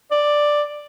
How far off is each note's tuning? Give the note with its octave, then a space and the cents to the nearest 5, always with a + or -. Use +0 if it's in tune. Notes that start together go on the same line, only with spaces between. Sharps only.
D5 +5